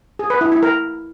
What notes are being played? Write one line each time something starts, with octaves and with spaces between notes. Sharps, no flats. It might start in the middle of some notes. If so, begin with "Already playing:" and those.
G#4
B4
E4
E4
A#4